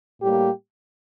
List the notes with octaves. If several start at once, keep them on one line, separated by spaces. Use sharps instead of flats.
A2 G3 A#3 G4